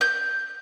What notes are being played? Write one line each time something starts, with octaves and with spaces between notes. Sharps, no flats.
G6